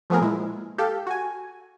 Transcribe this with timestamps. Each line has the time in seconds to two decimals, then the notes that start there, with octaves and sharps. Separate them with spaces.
0.10 F3 A3 B3 G#4 A#4
0.21 A#2 G#3 E4
0.78 G4 A4 F5
1.07 F#4 G#5